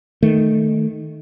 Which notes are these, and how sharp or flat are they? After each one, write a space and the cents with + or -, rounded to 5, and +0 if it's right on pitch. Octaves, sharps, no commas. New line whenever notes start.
D#3 +0 A3 +0